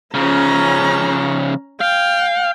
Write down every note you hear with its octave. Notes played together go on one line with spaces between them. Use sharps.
C#3 F3 C#4 A#5
F5 G5